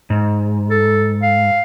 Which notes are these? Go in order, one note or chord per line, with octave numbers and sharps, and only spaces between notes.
G#2
A4
F5